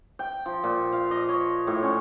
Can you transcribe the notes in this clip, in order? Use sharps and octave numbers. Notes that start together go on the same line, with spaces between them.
G5
F3
A#2
F5
D#5
C#5
A2
C#4